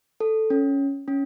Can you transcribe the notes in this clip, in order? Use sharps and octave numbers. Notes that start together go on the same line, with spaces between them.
A4
C#4
C#4